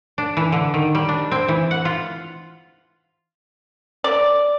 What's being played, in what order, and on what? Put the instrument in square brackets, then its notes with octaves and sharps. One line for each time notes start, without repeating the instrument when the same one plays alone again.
[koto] D4
E3
D3
D#3
G3
D4
C4
E3
F#5
F4
[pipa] D5